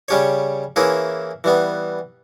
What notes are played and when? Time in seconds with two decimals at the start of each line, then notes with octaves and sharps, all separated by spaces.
0.08 C#3 G3 C#4 G4 C#5
0.76 E3 A#3 C#4 E4 G#4
1.44 E3 G3 B3